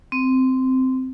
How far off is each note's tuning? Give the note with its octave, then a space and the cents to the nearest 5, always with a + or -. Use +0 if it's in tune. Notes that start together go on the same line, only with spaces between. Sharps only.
C4 -10